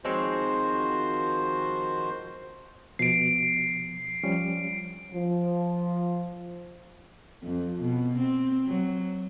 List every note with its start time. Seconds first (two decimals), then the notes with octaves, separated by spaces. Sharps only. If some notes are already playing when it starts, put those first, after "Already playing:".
0.05 D#3 F3 G#3 C4 F#4 C5 C#5
2.99 B2 F3 C7 D7
4.23 F3 G3 C#4
5.12 F3
7.43 F2
7.81 B2
8.18 C4
8.67 F#3